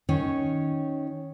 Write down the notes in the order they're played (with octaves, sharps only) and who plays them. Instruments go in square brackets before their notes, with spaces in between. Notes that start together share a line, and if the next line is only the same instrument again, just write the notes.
[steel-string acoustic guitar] D#3 C#4 C#5